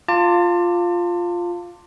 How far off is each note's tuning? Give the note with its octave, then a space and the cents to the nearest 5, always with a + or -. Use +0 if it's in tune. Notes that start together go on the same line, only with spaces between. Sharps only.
F4 +0 A5 +35 D6 +0